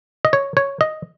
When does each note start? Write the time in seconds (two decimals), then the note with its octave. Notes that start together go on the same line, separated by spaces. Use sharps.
0.25 D#5
0.33 C#5
0.57 C#5
0.81 D#5